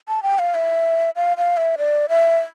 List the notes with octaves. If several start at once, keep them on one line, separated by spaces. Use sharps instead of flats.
A5
G5
F5
E5
F5
F5
E5
D5
E5